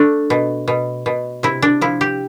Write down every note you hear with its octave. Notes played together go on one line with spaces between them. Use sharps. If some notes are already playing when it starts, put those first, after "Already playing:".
Already playing: A3 D4
B2
B2
B2
C3 E4
D4
F3 E4
G4